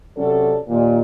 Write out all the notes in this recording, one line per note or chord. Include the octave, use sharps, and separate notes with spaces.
C3 F#3 C#4 A4 D5
D#2 A#2